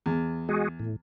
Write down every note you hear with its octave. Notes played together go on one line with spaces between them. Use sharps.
E2
G#3 F#4 G#4
A2